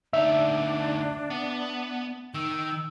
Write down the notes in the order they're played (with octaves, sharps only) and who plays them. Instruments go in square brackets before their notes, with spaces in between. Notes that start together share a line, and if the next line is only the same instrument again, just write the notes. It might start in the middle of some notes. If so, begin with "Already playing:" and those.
[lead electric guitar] D2 D#4 [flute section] D4 [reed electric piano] E5
[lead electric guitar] B3
[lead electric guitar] D#3 D#4 [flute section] E6